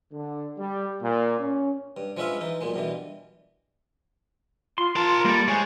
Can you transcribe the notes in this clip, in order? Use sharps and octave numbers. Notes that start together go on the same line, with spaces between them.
D3
G3
A#2
C#4
G2
F3 G#3 C#4 B4 E5 F5
E3 D#4
B1 A#2 G#3
G2 B2 E3
F4 C6
F4 A#4 A5
G3 A#3 A4
G#3 C5 C#5 G#5